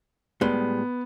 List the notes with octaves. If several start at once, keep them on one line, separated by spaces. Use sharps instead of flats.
A2 G3 G#3 B3